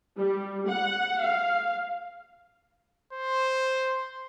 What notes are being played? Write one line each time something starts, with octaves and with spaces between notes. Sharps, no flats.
G3
F#5
F5
C5